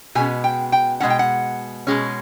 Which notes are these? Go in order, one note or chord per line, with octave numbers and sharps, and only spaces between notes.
B2 G#3 C#4 G#5
G5
G5
B2 G#3 C#4 F#5
G5
F#5
B2 G#3 C#4